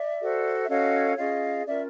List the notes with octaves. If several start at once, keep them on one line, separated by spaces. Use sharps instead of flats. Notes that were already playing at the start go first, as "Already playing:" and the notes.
Already playing: D5 E5
F#4 A4 C5
E5
C#4 F#4 A4 C#5 D#5 F5
C#4 F4 G#4 D#5 F5
C#4 F4 A#4 D5 E5